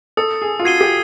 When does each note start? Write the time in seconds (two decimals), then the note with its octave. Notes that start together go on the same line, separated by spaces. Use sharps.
0.17 A4 D#6
0.42 G#4
0.60 F4
0.65 F#4 G#6 C7 D#7 G7
0.81 G4